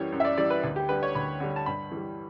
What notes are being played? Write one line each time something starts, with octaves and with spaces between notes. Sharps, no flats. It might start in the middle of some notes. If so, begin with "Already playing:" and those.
Already playing: F#2 E3 G3 C#5
F#2
E5
D5
E3 G3 D5
B4
D2
G4
D3 G3 B4
C#5
D2 B5
D3 G3
A5
G2 B5
E3 G3